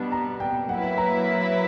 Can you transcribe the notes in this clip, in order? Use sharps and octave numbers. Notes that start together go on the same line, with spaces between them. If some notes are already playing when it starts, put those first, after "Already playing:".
Already playing: B2 G3 B3 D4 B5
A#5
G5
F#3 A#3 E4 B4 F#5
A#5